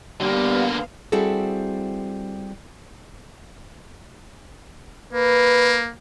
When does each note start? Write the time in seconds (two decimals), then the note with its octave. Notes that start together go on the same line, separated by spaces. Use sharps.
0.21 D3 G3 A#3 B3 F5
1.12 G3 C4 E4 F#4 G#4 A4
5.13 A#3 B4